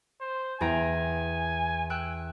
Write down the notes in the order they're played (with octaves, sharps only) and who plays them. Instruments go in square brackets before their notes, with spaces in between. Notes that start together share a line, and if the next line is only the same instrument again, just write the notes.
[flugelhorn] C5
[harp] E2 G5 A#5 [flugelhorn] G#5
[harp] G5 E6 F#6